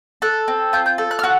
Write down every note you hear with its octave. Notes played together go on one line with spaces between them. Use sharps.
A4 F#6
C4
F4 G6
G6
A4
F#6
F6
F#4 F#6